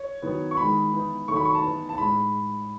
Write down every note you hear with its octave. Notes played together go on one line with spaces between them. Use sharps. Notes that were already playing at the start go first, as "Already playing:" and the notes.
Already playing: C#5
D#3 F#3 B3 D#4
C#6
D#3 G#3 D#4 B5
E3 B3 D#4
D#3 F#3 A3 D#4 C#6
B5
C#6
A5
E3 B3 D#4
A5
A2 G#3 D#4 B5